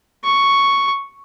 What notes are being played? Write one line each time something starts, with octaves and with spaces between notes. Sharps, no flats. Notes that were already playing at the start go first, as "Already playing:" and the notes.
C#6